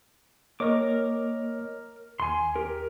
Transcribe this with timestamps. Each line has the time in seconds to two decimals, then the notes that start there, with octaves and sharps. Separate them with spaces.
0.60 A#3 A#4 C#5 D#5 D6
2.20 D#2 G#5 C6
2.56 G4 A#4